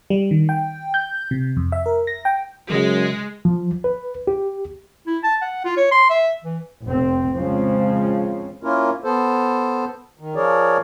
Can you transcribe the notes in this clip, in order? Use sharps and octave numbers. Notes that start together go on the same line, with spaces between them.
G3
D#3
G5
G6
C3
F2
E5
A#4
A#6
G5
F#2 C#3 G#3
F3
B4
G4
E4
A5
F#5
F4
C#5
C6
E5
E3
F1 C4
C#3 F3 G#3 C4 C#4
A#3 C#4 E4 F4 A#4
B3 A4 C5
D#3
F3 G#4 A#4 C#5 D5